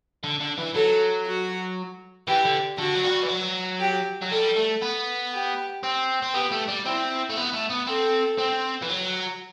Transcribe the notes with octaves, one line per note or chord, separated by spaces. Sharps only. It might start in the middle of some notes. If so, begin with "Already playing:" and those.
D3
D3
E3
F#3 A4
F#4
E3 G4
D3
D3 F#4
F#3
G3
E3
F#3
G4
F#3
G3 A4
A3
B3
G4
C4
C4
B3 G4
A3
G3
C4 E4
A3
B3
A3
B3
C4 A4
C4
E3
F#3